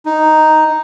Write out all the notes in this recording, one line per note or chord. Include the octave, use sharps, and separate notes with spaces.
D#4